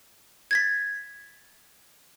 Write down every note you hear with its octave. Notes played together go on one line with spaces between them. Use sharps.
G#6 A6 B6